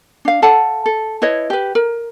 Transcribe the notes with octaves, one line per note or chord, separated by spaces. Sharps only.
D4 F5
A4 F5 F#5 A5
A4
E4 B4 C#5 D#5
G4 B4
A#4